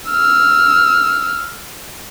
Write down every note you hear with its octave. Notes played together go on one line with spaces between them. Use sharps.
E6 F6